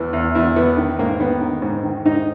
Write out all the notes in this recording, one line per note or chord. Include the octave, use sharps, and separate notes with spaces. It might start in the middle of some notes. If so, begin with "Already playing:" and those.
Already playing: E2 E3
E2
E2 E4
E3 B3
D#3
G#2 A#3
D#3 B3
D#3
G#2
D#3
G#2 D#4